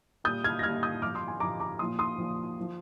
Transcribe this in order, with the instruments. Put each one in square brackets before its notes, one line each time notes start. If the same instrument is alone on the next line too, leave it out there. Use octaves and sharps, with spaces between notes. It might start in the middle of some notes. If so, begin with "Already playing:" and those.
[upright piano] A#2 G3 D#6 G6
F6 G#6
A#6
A#2 G3 F6 G#6
D#6 G6
G2 F3 D6 F6
C6 D#6
G#5 C6
G2 F3 A#5 D6
A#5 D6
A#2 F3 C6 D#6
C6 D#6
A#2 F3
F3